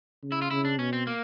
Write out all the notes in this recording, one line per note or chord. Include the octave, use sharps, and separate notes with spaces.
C#3
E4
F4
C#3 E4
D4
B2 C#4
C4
A#3